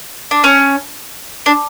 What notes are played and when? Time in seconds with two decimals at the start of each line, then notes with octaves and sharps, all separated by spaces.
0.31 D4
0.44 C#4
1.46 D4